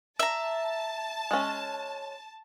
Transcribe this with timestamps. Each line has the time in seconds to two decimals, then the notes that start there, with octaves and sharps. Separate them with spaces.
0.19 E5 A5 A#5
1.31 G#3 C#4